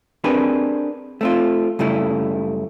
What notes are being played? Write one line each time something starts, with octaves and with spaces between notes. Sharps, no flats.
C4 D4 G4 G#4 A#4 B4
A3 C4 F4
F#2 C#3 G3 A3 E4